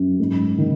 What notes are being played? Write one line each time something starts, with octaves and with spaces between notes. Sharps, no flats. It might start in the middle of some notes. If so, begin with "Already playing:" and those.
Already playing: F#2
G#2
D#3